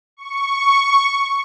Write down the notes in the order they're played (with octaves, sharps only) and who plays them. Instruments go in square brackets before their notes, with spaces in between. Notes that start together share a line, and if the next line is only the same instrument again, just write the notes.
[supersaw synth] C#6